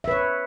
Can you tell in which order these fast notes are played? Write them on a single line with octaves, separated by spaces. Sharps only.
E5 B4 C#5